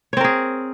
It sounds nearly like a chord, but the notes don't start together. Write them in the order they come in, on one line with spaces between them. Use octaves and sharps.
C#5 C4 A#4 G#4